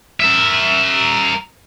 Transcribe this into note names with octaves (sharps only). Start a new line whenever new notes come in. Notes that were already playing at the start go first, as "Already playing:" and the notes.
A#4 E5